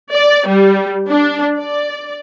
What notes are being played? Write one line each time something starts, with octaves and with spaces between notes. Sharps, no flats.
D5
G3
D4
D5